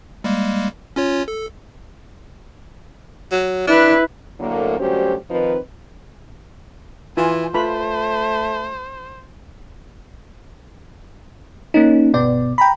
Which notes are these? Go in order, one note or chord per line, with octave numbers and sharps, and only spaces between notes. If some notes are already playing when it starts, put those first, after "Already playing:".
G3 G#3 A#3
C#4 F4 C#5
A4
F#3
D4 E4 B4
A2 D3 F#3 A3 A#3
D2 G2 F#3 C#4 G4 C5
D#3 F3 C4 D#4 B4
E3 F4 G#5
A3 F4 B4 C5 B5
A#3 C#4 D#4
G1 B2 B3 D5
G5 A#5 B5